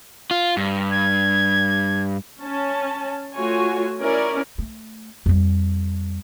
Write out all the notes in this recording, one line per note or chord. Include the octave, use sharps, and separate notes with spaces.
F4
G2
G#6
C#4 A5
A3 F4 F#4 C#5 G#5
C#4 E4 A#4 D5
A3
F2 G3